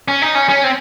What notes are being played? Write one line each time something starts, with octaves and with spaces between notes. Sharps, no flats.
C#4
D#4
C#4
C#4
C4